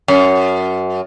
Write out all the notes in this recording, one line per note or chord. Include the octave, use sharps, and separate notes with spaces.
F#2